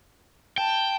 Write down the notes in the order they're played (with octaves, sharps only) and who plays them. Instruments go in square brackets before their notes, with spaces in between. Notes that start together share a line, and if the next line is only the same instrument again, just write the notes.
[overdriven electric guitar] G5 [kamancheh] A5